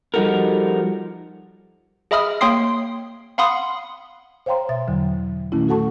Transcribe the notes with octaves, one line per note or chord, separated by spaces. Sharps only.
F3 G3 D#4 F#4 A4 A#4
G#4 D#5 E5 B5 D#6 F6
A#3 C#5 G5 C6 D#6 C7
F5 F#5 B5 C6 D#6
C5 C#5 F5 G5 A#5 C6
B2 E5 A6
E2 D3 F#3
A#2 D#3 A3 C#4 E4
F#4 A4 F#5 A5 C#6